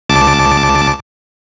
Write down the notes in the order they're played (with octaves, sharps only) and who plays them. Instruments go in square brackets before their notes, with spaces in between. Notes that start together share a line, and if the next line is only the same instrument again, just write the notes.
[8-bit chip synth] C#2 A5 D6